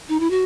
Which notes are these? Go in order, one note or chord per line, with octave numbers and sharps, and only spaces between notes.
D#4
E4
F#4